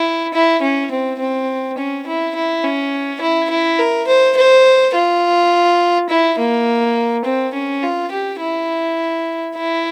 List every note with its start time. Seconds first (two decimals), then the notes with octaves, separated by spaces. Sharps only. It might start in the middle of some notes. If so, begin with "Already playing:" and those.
Already playing: E4
0.34 E4
0.62 C#4
0.91 C4
1.20 C4
1.78 C#4
2.06 E4
2.35 E4
2.64 C#4
3.21 E4
3.50 E4
3.79 A#4
4.07 C5
4.37 C5
4.95 F4
6.09 E4
6.39 A#3
7.25 C4
7.54 C#4
7.83 F4
8.12 G4
8.40 E4
9.56 E4